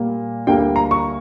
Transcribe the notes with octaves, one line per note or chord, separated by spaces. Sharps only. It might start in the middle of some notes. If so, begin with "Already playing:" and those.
Already playing: A#2 G3 A#3
D2 D3 G3 A#3 G5
A#5
C#6